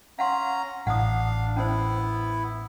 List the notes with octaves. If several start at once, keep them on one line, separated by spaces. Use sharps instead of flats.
C#4 F5 F#5 A#5 C6
A1 D4 F5 F#5 D#6
B3 C#4 E4 C5